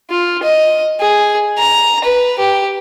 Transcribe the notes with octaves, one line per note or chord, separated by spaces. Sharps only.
F4
D#5
G#4
A#5
B4
G4